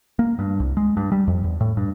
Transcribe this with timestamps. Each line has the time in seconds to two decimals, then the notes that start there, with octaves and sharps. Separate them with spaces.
0.19 A#3
0.39 G2
0.60 C2
0.77 G#3
0.97 G2
1.12 G3
1.28 F2
1.44 E2
1.61 A2
1.77 G2